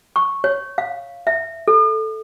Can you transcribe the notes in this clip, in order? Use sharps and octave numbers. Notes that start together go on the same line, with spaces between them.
C#6
C#5
F5
E5
A4